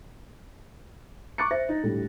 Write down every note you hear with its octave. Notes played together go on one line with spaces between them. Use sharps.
C#6 D6 F#6 A6 C#7
C5 E5 A#6
D#4
D2 A2 G3